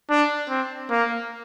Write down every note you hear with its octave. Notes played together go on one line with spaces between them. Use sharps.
D4
C4
A#3